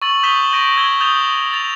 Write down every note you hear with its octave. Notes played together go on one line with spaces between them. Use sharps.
C#6 E6 A6 F#7
D#6 G6 B6 E7 G7
C#6 G6 A#6 D7 E7
C#6 E6 G#6 G7
D#6 G6 A6 E7 F7 G7
A6 F7